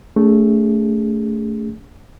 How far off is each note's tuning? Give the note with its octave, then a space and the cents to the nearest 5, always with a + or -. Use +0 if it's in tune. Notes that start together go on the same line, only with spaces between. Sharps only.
A3 +5 C#4 +45 G#4 -25